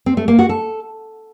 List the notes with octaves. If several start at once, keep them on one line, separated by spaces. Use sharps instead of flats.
C4
A3
A#3
F#4
A4